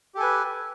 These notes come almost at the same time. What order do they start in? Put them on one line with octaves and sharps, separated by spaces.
G4 A4 G#5 B4